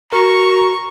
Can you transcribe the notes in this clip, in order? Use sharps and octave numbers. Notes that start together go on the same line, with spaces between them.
F#4 A#4 A#5 C#6